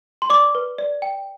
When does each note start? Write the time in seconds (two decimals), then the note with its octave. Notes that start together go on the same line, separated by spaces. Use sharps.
0.22 C6
0.30 D5 D6
0.55 B4
0.78 D5
1.02 G5